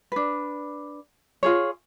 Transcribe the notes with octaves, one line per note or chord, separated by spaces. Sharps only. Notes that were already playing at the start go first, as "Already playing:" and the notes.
D4 B4
F4 G#4 C#5